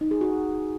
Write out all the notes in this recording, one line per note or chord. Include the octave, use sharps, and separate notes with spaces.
D#4
G#4
F#4